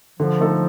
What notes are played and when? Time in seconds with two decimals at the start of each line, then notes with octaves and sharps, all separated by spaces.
0.20 D3 F3
0.40 A3 D#4 A4